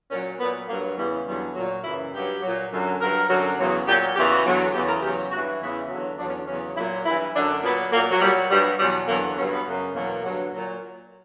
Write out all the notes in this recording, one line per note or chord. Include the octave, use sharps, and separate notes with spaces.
A#2 F#3 C#4
A#2 F#3 B3
G2 F#3 A#3
E2 C#3 E3 G3
E2 D3 F#3 G3
A#2 F#3
F#2 C#3 E3 E4
G2 F#3 G4
A#2 F#3
F#2 D3 F#3
G2 F#3 A#4
F#2 D3 F#3
E2 C#3 F#3
A#2 F#3 G4
E2 C#3 E3 G4
F#4
E2 D3 F#3
E2 C#3 E3 G4
A#4
E2 C#3 F#3 G4
G2 E3 F#4
E2 C#3 E3 E4
E2 D3 F#3
E2 D3 F#3 D4
C#4
E2 C#3 F#3 C#4
A#2 F#3 E4
G2 E3 E4
F#2 D3 F#3 D4
A#2 F#3 B3
A#2 F#3 A#3
F#3
A#2 F#3 G3
G2 F#3 G3
E2 B2 F#3 G3
E2 D3 F#3 A#3
G2 F#3 C#4
B3
F#2 C#3 F#3
E2 B2 F#3 A#3
G2 D3 F#3
A#2 F#3